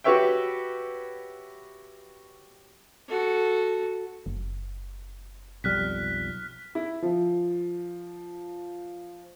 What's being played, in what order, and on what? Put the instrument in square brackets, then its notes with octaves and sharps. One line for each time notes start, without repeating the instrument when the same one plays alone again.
[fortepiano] F#4 G4 B4 C#5 E5 G5
[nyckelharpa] F#4 A4
[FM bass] F#1
[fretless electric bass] B1 F2 G3 [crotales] F6 F#6 B6
[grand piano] E4
F3